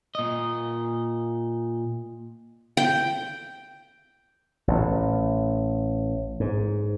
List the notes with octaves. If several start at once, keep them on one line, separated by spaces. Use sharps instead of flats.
A#2 D#5
G5
A1
G#2